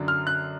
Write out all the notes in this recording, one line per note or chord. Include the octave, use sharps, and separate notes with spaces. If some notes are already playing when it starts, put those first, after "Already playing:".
Already playing: F#2 D3 F#3 D4
F6
F#6